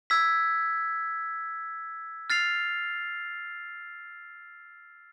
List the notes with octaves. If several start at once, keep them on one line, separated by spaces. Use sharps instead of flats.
E6 G#6 B6
F6 A6 C7 F7